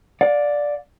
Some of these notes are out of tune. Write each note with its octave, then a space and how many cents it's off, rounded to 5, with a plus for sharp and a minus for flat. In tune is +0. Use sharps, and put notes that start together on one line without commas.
D5 +0 F5 +45